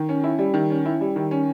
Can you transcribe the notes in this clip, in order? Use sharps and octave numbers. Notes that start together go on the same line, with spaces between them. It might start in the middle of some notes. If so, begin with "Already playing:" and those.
Already playing: D#3
C#4
E4
G3
D#3
C#4
E4
G3
D#3
C#4